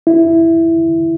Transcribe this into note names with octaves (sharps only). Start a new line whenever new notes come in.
E4